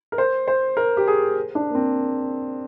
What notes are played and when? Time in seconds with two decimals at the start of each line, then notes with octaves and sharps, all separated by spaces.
0.12 A#4
0.18 C5
0.48 C5
0.77 A#4
0.97 G4
1.07 G#4
1.55 D4
1.70 A#3
1.75 C4